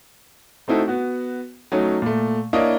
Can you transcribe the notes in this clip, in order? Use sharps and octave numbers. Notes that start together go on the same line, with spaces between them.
A3 C4 D#4 E4 F#4 A4
B3 F#4
F#3 A3 C#4 D#4
A#2 A3
A#3 D4 E4 C#5 D#5